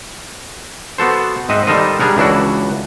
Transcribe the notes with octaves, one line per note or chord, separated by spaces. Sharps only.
B3 F#4 A4 C5
G#2 C4 D#5 E5 F#5
G3 D#4 A4 A#4 C5 D#5
G3 D4 G#4 A#4 F#5
C#2 E3 D4 E4 F#4